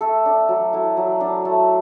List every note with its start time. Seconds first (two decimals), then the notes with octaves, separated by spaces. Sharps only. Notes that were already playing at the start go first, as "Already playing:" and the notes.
0.01 A3 A4
0.26 D4
0.49 F#3
0.73 A3 E4
0.97 F#3
1.21 D4
1.45 A3